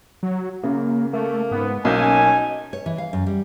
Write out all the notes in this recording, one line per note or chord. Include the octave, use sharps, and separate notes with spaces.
F#3
F#2 C#3 A#3
A3 A#3
G#2 B3
B1 A#3 C#4 D#4 G#5 G6
C#5
E3
F5
F#2
G3